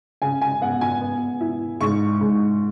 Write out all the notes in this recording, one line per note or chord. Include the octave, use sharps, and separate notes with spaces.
C#3 G#5
G#5
B3 F#5
G#5
B3
E4
G#2 C#6
G#2